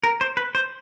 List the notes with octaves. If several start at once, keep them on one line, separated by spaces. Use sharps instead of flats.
A#4
C5
B4
C5